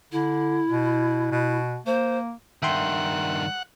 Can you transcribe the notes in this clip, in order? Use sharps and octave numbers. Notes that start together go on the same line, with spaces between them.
D3 E4
B2
B2
A#3 C5
G2 D#3 E5 F#5 G5 C6